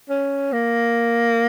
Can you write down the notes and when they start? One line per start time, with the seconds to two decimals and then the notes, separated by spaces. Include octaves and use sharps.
0.10 C#4
0.53 A#3